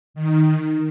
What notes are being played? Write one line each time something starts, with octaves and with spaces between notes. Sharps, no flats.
D#3